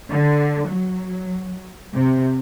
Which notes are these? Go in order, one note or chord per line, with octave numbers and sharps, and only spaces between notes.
D3
F#3
C3